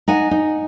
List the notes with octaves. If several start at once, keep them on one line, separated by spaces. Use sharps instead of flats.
D#4 F#5 G#5
D#4